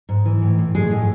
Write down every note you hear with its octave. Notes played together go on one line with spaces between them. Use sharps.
G#2
E3
A2
A2
A2 G#3 G#4
A2